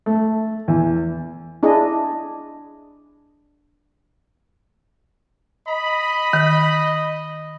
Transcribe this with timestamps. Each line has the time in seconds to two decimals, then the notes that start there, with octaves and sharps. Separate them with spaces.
0.06 A3
0.68 E2
1.63 D4 E4 G#4 D#5
5.68 D#5 B5
6.33 D#3